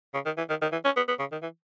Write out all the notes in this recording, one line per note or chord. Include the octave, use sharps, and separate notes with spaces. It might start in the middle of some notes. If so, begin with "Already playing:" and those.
C#3
D#3
E3
D#3
D#3
E3
C#4
B3
B3
C#3
D#3
E3